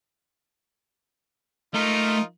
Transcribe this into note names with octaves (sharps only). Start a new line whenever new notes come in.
A3 D#4 F4 A#4